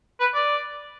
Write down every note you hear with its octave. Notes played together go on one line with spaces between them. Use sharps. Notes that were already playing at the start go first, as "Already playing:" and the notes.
B4
D5